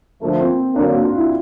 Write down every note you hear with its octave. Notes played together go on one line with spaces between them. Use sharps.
D3 F3 A3 A#3
C4
D3 F#3 A#3 D4
F#4
F4
E4